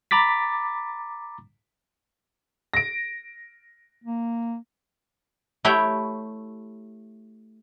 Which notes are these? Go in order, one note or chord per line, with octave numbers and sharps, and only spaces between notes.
A#5 B5 D6 A6 B6
A#6 D7
A#3
A3 E4 G4 C#5 G5